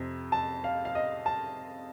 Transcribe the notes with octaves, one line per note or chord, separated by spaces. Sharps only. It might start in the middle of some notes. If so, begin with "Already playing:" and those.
Already playing: F2 C3
A5
F5
F5
D#5
A5